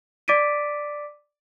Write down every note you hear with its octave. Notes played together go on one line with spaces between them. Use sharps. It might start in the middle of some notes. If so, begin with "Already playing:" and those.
D5 D6 A6 B6 D7 D#7